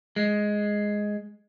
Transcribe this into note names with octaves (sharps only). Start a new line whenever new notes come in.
G#3